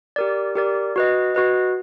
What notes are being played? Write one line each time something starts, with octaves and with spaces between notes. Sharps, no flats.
G4 A#4 D5
G4 A#4 D5
F#4 B4 D#5
F#4 B4 D#5